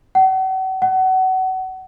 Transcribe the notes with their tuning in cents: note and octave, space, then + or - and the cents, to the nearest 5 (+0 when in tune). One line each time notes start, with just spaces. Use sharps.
F#5 +40
F#5 +30